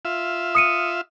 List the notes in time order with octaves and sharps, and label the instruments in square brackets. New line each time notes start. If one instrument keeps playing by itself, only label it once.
[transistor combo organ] F4 E5
[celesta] D#6 C#7 D#7